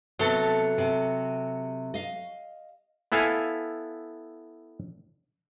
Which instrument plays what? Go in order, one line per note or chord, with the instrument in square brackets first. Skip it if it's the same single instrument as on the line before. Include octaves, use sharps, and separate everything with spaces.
[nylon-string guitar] C3 B3 [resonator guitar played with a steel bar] F#3 A4
[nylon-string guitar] C3
D#5 F5
[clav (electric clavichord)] B3 E4 A4 F5 G#5